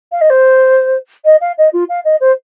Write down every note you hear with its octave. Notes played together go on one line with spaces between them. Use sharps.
F5
D#5
C5
D#5
F5
D#5
F4
F5
D#5
C5